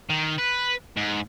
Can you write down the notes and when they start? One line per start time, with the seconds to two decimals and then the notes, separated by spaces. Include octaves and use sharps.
0.10 D#3
0.39 B4
0.97 G#2